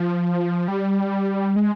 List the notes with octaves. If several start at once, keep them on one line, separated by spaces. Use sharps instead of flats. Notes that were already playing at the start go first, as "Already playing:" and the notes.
Already playing: F3
G3
G#3